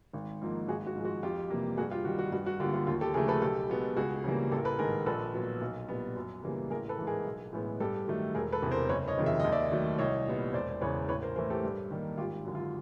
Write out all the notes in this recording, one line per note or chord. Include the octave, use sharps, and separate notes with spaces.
G#1
G#2 F3 A#3
G#1 F#4 G#4
F#4
G#2 F3 G#3
F#4
F2 F4 G4
C3 E3 G3 A#3
G2 F#4 G#4
F4 G4
D#3 G3 F#4
F#4
G2 F#4
F#4
D3 F#3 A#3 F4 G4
F4 G4
D#2 F4
G4 A4
C#3 F3 A3 G#4 A#4
A4 B4
B1 G4 A4
B2 G#3 B3
C#2 F#4 G#4
C#3 E3 G3 A#3
A1 G4 A4
A#4
A4 B4
G#2 D#3 G#4 A#4
A#1 A4 B4
A#2 F#3 B3
B1
A#2 G3 B3
F#2
C#3 E3 G3 A#3
A1 G#4 A#4
A4 B4
G#2 E3
G#4 A#4
B1
A2 E3 G#3 B3
G2 G4 A4
D#3 F#3 A3
E1 G#4 A#4
A4 B4
E2 C3
A#4 C5
F#1 B4 C#5
C#5 D#5
F2 C3 D#3 G#3
E5
D#2 D#5
D5 E5
D#3 F#3 A3
C2 C#5 D#5
A#2 G3 B3
E1 C5 D5
E2 C#3 E3 B4 C#5
A1 B4 C#5
A#4 C5
A2 E3 A3 A#4 C5
G4 A4
G2
D#3 G3 A#3
G#1 F4 G4
F#2 D3
F4